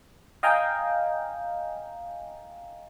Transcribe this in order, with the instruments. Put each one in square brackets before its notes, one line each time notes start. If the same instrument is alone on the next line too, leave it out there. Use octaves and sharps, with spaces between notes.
[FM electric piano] D#5 F5 G5 G#5 A#5